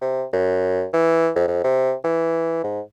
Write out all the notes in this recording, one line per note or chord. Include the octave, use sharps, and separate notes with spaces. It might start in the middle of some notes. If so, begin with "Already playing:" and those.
C3
F#2
E3
F2
F2
C3
E3
G#2